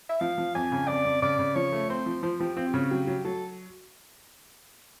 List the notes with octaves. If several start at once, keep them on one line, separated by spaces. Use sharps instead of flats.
E5
F3 F5
F3
F2 G#5
C#3
F2 D5
F2
C#3 D5
C#3
F3 C#5
A3
C4 C5
F3
F3 C5
F3 G4
C4 F4
G4
C#3 F#4
F#3 G4
F#3
F#3 A4